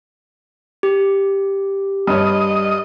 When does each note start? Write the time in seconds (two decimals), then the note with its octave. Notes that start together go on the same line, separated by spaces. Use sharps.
0.83 G4
2.07 G2 C#5 D#5